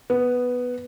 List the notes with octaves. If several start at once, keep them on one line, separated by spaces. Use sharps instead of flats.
B3